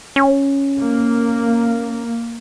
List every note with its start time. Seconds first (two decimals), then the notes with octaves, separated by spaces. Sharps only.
0.16 C#4
0.79 A#3